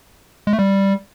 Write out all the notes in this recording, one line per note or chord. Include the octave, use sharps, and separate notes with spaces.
G#3
A3
G3